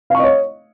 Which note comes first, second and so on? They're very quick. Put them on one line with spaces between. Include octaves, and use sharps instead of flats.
F5 C#6 D#5 C#5